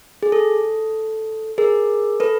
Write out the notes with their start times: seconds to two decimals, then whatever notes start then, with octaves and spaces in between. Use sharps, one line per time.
0.23 G#4
0.32 A4
1.58 G#4 A#4
2.20 A4 B4